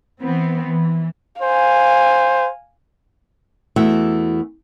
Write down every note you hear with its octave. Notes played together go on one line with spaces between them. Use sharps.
E3 B3 C4
E3
C5 F5 G#5
E2 E3 A3 F#4 E5